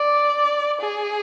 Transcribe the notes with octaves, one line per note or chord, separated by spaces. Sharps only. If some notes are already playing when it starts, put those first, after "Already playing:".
Already playing: D5
G#4